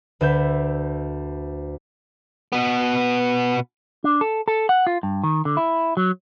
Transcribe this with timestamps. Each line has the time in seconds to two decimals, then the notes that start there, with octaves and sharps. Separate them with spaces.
0.21 D2 B4 E5 G6
2.52 B2 B3
4.04 D4
4.21 A4
4.48 A4
4.69 F#5
4.87 F4
5.03 G2
5.24 D#3
5.45 D3
5.57 E4
5.97 F#3